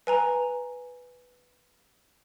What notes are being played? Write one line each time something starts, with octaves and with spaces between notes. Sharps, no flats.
B4 G#5 A#5